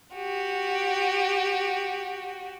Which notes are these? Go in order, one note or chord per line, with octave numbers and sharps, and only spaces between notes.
F#4 G4